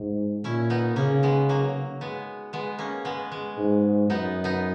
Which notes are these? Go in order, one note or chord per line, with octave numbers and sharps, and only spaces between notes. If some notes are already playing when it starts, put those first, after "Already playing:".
Already playing: G#2
A#2 C#4 E4
B3 D#4
C#3 A#3 C#4
G#3 B3
F#3 A#3
G#3 B3
G#3 B3
A#3 C#4
G#3 B3
G#3
G#2
F#2 B3 D#4
B3 D#4